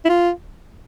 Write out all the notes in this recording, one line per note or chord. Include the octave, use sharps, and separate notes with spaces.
E4
F4